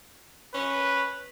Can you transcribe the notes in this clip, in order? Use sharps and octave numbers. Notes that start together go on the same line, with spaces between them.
C#4 B4